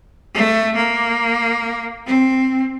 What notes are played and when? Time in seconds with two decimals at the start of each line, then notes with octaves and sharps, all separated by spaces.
0.35 A3
0.76 A#3
2.06 C4